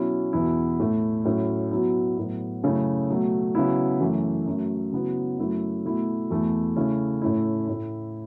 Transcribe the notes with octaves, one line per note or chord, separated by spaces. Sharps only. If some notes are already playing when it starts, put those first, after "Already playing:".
Already playing: B2 F#3 C#4 E4
E2 B2 B3 E4
A2 A3 E4
A2 F#3 C#4 E4
B2 F#3 B3 E4
A2 F#3 B3
F#2 C#3 A3 E4
B2 F#3 A3
C#3 F#3 B3 E4
F#2 E3 A3
F#2 F#3 A3
C#3 F#3 B3 E4
F#2 F#3 A3 E4
B2 A3 E4
E2 B2 A3 E4
C#3 A3 C#4 E4
A2 A3 C#4 E4
A2 A3 E4